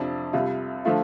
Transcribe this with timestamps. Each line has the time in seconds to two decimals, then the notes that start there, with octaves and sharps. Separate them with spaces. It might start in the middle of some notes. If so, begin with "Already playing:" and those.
Already playing: F2 C3 F3 D4
0.33 C2 C3 G3 F4
0.85 D3 F3 A3 F4